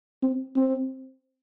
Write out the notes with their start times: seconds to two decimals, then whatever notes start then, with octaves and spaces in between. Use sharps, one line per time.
0.23 C4
0.56 C4